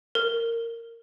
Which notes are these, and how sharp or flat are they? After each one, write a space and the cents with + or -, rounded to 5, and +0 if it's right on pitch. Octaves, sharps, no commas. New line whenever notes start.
A#4 -15